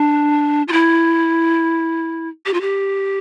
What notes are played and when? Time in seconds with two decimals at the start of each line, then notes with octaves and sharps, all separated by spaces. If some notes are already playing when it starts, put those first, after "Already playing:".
Already playing: D4
0.68 F4
0.72 E4
2.46 G4
2.54 F4
2.61 G4